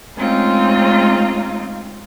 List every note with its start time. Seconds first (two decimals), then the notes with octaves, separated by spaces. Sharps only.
0.17 G#3 A3 C4 C#4 D#4 F4